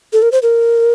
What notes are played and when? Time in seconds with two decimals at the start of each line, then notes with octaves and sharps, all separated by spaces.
0.13 A4
0.22 A#4
0.32 C5
0.43 A#4